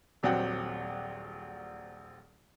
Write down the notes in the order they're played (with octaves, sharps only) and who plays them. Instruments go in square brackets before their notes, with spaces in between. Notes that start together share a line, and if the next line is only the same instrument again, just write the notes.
[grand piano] D#1 A#1 F#3 C4 F#5 G5